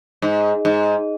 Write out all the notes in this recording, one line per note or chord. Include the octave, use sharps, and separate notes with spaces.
G#2
G#2